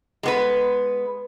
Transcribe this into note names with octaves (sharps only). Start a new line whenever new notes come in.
G#3 B3 B4